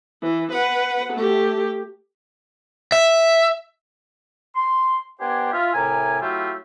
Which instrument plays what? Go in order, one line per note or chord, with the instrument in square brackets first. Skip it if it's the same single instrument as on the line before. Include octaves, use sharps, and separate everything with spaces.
[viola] E3
B4 F#5
A3 G4
[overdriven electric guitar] E5
[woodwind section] C6
B3 D4 G4 C5 G#5
F4 E5
A2 C3 A#4 G#5
F#3 A3 E4 F4 G4